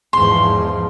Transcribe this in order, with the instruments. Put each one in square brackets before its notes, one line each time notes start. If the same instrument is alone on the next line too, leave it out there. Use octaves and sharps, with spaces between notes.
[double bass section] E2 G#2 F3 [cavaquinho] C6